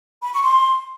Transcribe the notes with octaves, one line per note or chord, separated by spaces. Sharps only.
B5
C#6
C6